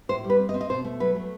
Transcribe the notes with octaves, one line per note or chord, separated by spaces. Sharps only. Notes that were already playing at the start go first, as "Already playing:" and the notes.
A2 C5
G3
B4
C4
D#5
C4
D#5
B2 C5
A3
F#3 B4
A3